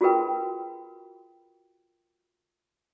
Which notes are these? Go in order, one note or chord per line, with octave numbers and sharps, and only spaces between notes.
F4 F#4 G#4 A#4 B4 G5